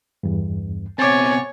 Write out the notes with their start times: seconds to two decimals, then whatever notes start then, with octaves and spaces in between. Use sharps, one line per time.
0.23 E2 G2
0.99 B2 C4 C#5 G#5 D6 A6